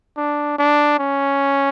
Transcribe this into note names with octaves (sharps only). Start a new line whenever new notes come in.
D4
D4
C#4